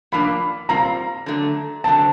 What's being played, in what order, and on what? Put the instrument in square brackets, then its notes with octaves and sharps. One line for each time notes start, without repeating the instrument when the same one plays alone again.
[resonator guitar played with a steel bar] A2 F3 A#3 D4 [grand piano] B5
[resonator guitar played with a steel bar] A#2 G3 C4 F4 [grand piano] A#5
[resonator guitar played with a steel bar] D3 F#3 A3
[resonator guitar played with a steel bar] D3 F#3 A3 C4 [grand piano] A5